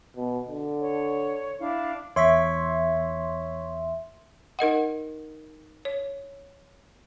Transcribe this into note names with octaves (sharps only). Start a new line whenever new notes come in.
B2
D3
C#5
D4 E4 F5
E2 C#5 E5 C6 C#6 B6
D#4 A#4 D#5 F#5
C#5